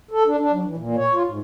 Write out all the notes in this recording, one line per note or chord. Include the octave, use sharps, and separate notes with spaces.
A4
D4
D4
F#3
E3
A#2
C#5
F4
G#2